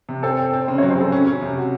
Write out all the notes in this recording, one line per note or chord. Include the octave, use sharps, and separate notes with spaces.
C3
C4 A4
C4
C4
C#3 C5
F#3 C#5
C5
C#3 G#4 A4
C#4
C#4
C3
F#4